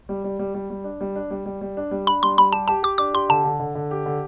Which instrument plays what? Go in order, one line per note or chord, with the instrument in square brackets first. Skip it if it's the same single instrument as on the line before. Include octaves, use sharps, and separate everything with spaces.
[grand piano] G3
G3
G3
G3
G3
D4
G3
D4
G3
G3
G3
D4
G3
[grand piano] D4 [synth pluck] B5
[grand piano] G3 [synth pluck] C6
[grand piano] G3 [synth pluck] B5
[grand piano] G4 [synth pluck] A5
[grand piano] G4 [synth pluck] A5
[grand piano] G4 [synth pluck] D6
[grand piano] D4 [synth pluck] D6
[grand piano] G4 [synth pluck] C6
[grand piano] D3 [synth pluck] A5
[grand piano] D3
D3
D3
G4
D3